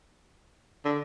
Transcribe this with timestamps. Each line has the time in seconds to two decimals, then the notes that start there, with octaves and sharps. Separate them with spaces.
0.85 D3